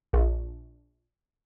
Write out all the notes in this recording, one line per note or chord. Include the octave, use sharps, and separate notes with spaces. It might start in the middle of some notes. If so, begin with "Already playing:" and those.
A#1